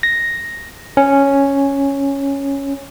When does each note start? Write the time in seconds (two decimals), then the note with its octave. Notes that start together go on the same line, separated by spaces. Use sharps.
0.03 A#6
0.97 C#4